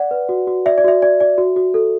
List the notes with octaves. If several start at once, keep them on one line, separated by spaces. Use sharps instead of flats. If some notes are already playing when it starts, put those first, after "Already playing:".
Already playing: D5 F#5
B4
F#4
F#4
D5 E5
D5
F#4 E5
D5
D5
F#4
F#4
A4